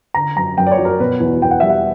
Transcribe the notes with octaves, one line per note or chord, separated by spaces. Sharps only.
D3 A#5
F#2 A#5
F#2 G5
D5
C#5
F#3
A#4
B2 B4
E2
E2 G5
F#5
G3 E5
F#5